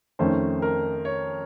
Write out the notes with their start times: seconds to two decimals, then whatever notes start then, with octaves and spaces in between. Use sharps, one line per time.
0.19 F2 D#3 A3 C#4 C5
0.62 A#4
1.05 C#5